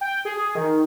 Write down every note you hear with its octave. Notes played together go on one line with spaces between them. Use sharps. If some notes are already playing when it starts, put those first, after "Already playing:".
G5
G#4
G#4
D#3